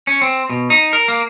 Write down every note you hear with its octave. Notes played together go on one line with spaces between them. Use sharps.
C#4
C4
B2
D#4
A#4
A#3